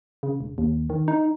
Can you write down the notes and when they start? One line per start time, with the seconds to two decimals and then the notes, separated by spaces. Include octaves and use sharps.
0.23 C#3
0.41 E1
0.58 D#2
0.90 D#3
1.08 D#4